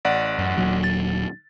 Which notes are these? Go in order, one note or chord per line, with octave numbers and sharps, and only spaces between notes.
A1 D5 F#5
F#2
D#1 A#2 F#3
A6